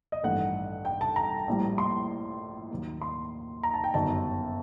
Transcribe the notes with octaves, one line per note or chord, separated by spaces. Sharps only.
D#5
A1 G2 D#3 A3 F#5
G5
A5
A#5
A#1 A2 G3
C6
D#2 D#3 F#3 A#3
C6
A#5
A5
G5
G1 F#2 D#3 A5